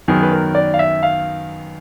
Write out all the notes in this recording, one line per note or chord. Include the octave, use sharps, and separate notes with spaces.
F#2 D#3 F#3 B3 G#4
B4
A#4
D5
F5
E5
F5